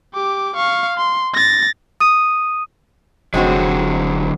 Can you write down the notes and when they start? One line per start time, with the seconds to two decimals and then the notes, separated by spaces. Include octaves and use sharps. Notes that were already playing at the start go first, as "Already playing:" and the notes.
0.14 G4 D6
0.56 F5 C#6
0.97 C6
1.34 A6 A#6
2.00 D#6 D#7
3.34 F1 D3 F#3 G#3 C4 F#4